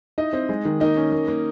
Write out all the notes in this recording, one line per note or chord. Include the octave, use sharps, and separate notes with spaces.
D#4 E4 D#5
C4
G#3
D#3
A#3 D#4 D#5
C#4
A#3
A#3